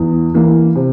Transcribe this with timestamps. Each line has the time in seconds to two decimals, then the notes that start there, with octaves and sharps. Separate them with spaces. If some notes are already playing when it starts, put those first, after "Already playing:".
Already playing: E2
0.34 E3 A#3
0.76 C3